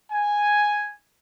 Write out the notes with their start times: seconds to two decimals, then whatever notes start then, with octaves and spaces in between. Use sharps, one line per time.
0.12 G#5